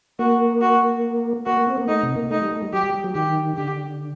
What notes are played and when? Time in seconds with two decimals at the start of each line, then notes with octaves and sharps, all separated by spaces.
0.19 A#3 F#4
0.61 F#4
1.46 A#3 F#4
1.57 A#3
1.67 C4
1.78 A#3
1.88 A3 D#4
2.03 C3
2.16 A#3
2.31 A3 D#4
2.41 G3
2.52 A3
2.63 G3
2.73 F#3 G4
2.84 G3
2.94 G3
3.04 F#3
3.14 D#3 G4
3.57 D3 G4